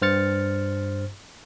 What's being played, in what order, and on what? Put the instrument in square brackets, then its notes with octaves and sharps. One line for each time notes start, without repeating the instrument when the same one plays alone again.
[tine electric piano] G2 C5 F6 A6 C#7